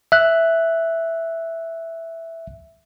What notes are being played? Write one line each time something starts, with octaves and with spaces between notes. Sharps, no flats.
E5 F#6